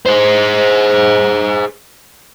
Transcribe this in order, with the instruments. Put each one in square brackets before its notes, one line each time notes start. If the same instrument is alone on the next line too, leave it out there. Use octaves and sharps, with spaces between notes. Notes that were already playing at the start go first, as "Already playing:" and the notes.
[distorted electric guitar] G#4 C5